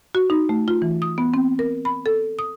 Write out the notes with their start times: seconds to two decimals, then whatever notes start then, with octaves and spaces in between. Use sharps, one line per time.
0.15 F#4
0.30 D#4
0.49 A3
0.68 F4
0.82 E3
1.02 D#6
1.18 B3
1.34 C4
1.59 A#4
1.85 B5
2.06 A4
2.39 D#6